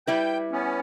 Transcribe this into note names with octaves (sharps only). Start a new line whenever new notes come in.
G3 E4 B4 G5 G6
B3 C#4